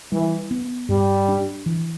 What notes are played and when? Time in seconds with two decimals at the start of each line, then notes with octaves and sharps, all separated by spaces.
0.12 E3 G3
0.51 B3
0.89 G2 G3
1.28 D4
1.66 E3